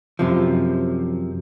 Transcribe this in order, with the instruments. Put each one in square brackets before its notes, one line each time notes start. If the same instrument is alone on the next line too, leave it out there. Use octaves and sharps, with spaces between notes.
[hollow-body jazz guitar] F#2 C3 F3